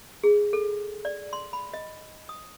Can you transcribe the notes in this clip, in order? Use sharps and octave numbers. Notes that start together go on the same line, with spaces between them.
G#4
A4
D5
C6
B5
D#5
D#6